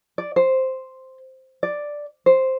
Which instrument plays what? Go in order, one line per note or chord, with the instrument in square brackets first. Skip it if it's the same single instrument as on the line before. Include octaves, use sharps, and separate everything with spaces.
[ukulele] D5
C5
D5
C5